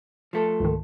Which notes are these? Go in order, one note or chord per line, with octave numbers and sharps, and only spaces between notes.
F3 A3 A4
C#2 G#2 D#3